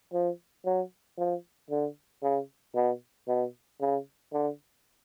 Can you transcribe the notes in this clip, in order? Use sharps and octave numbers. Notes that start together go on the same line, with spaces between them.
F3
F#3
F3
D3
C#3
B2
B2
C#3
D3